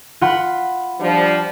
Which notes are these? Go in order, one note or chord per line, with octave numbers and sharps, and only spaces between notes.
F4 F#5 B5
F3 G3 D4